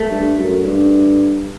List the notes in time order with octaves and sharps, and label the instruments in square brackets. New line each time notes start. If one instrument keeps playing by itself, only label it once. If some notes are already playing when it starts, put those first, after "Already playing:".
Already playing: [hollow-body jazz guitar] A3
[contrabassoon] G2
F#2
G2